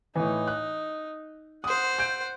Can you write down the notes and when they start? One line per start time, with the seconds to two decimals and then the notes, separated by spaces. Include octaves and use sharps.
0.15 A2 E3 D#4
0.47 F#6
1.64 C5 F#5 D#6
1.99 G6 D7